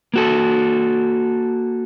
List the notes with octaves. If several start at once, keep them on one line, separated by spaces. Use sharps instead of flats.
A#3 F#4 A4